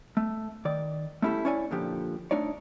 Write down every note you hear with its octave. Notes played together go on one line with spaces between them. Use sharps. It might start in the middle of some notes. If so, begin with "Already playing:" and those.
A3
D#3 D5
A3 C#4 E4 G4 A4
C#4 E4 C#5 D5 F#5 G#5
A#2 D3 F3 G4
A3 D4 D#4 C#5 D5